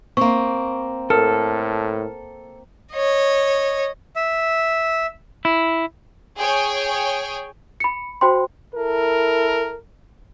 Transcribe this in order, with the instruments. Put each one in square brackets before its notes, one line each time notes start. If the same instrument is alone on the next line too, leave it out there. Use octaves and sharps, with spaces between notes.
[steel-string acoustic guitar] A#3 C4 [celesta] C#6
[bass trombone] A2 [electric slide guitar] A4 [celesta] A#4 F6
[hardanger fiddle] C#5 D#5
[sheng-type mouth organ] E5
[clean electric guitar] E4
[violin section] G#4 C#5 G5 G#5
[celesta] B5 C#7
F#4 C5 G5 B5 C6
[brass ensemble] E4 A4 A#4